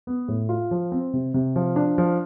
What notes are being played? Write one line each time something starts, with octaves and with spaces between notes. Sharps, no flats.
B3
A2
F4
F3
C4
C3
C3
F3
D4
F3